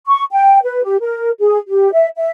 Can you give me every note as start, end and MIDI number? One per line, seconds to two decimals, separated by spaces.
0.07 0.24 85
0.32 0.58 79
0.65 0.83 71
0.84 0.97 67
1.01 1.31 70
1.39 1.57 68
1.68 1.90 67
1.92 2.08 76
2.17 2.30 76